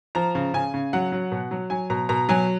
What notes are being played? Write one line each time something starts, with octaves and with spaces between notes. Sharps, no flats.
F3 A#5
C#3
C#3 G#5
C#3
F#3 F#5
F#3
B2
F#3
F#3 G#5
B2 A#5
B2 A#5
F#3 G#5